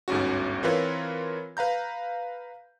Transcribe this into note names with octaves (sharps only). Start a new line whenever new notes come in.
G1 D2 G#2 C#4 F#4
E3 C4 F4 A#4 B4 C#5
B4 F5 A#5 G6